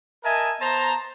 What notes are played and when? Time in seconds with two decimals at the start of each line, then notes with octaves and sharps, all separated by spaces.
0.24 A#4 D#5 E5 G#5 A5
0.61 B3 C5 A5 A#5